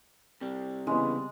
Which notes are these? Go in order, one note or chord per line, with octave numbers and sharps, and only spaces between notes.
C3 G3
C#3 E3 G#3 B3